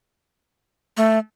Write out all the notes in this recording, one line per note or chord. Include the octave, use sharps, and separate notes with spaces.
A3